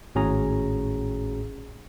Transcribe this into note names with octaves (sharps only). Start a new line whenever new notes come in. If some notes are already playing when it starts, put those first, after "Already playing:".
G#1 A2 C#4 F#4 G#4 A#5